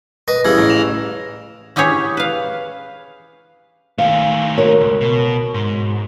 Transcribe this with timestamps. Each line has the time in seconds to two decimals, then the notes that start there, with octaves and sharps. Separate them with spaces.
0.28 B4 D#5 A#6
0.45 C#3 E3 G3 E6 F6 G#6
0.58 A1 A#6
0.70 E7 F7
1.76 C#4 E4 G4 G#4 C#5
2.17 B4 F5
3.98 D#3 A3 F5 G#5
4.58 F#4 A#4 C#5
4.80 C#2
5.01 B2
5.54 G#2